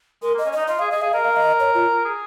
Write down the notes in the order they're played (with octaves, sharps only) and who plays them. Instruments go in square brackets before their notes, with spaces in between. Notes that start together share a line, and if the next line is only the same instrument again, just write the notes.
[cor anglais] G#3 [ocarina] A#4
[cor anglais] A#3 [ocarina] D#5
[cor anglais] C#4
[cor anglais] D#4 [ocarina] D#5
[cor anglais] F4 [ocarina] D#5
[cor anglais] G#4 [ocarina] F5
[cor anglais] G#4 [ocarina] D#5
[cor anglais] G#4 [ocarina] F5
[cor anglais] A#4 [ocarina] D#5
[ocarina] F5
D#5
C#5
F4
[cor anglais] G#4